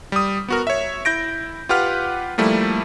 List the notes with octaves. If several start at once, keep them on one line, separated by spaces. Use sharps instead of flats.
G3 D#6
B3 F#4 A#4
C#5 E5
E4 G6 A#6 D7
F4 G4 B4 F#5 F6
F3 G3 A3 A#3 E4